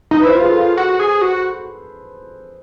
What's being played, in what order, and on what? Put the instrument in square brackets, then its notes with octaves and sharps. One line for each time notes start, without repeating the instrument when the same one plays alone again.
[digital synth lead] D#4
[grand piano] B4
[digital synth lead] E4 [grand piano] C5
[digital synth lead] F4 [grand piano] B4
[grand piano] G#4
A4
[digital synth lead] F#4
G#4
F#4